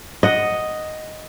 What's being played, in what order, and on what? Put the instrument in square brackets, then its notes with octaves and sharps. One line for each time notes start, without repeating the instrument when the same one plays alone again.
[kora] D#5 F#5